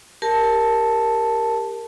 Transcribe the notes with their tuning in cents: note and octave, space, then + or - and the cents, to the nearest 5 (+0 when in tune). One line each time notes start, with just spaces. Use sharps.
G4 +25 A#4 +0 A5 +0